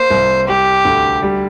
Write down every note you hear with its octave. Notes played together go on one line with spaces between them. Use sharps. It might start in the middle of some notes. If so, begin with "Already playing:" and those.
Already playing: A#3 C5
C2
G3 G4
D2
G3